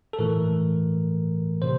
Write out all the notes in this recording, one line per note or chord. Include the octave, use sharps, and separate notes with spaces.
A4
A2 E3 A3 A#4
C3 C5